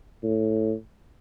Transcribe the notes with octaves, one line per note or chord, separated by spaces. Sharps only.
A2